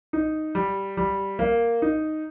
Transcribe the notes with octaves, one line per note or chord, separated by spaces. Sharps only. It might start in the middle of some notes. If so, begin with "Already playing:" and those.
D#4
G3
G3
A#3
D#4